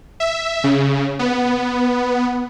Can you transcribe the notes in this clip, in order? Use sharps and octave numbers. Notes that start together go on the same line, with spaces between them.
E5
C#3
B3